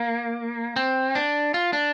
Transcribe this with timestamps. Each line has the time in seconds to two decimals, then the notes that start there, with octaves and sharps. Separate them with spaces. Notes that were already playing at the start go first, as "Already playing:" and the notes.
Already playing: A#3
0.76 C4
1.15 D4
1.54 F4
1.73 D4